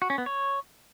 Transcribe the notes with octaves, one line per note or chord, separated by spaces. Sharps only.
F#4
C#4
B3
C#5